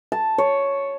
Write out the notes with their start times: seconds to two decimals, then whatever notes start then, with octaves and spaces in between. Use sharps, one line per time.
0.12 A5
0.38 C#5